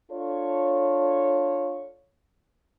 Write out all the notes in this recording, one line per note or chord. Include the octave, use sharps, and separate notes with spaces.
D4 F4 A4 C#5